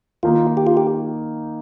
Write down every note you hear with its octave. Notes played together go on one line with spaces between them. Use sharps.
D#3 A#3 D#4 F4
G4
F4
G4